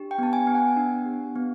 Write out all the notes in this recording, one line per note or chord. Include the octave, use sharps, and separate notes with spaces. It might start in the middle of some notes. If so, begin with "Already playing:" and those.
Already playing: D4 G4
G5
B3 A5
G#5
B3
F#5
D4
G4
B3